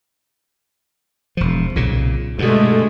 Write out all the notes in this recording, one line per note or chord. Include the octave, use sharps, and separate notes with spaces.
E1 F3
B1 A#2 C#3
G2 B2 D3 G#3 A3